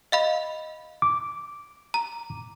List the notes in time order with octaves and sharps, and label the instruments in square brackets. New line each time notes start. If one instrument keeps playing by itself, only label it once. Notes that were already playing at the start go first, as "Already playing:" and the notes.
[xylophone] D#5 F5 B5
[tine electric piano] D6
[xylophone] A#5